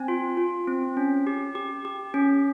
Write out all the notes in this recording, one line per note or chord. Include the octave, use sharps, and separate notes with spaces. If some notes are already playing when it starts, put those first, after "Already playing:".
Already playing: C4 G#5
F4
F4
C4
C#4
G4
G4
G4
C#4